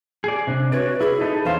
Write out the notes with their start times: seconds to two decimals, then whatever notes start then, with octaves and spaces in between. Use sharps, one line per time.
0.24 G#4 D5
0.47 C3 D4
0.72 F#4 B4 C#5 D5
1.01 E4 G#4
1.21 D#4 A4 B4
1.45 E2 C#4 C5 F5